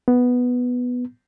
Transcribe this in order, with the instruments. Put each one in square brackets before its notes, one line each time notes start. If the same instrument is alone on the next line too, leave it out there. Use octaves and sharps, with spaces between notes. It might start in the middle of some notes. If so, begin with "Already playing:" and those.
[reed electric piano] B3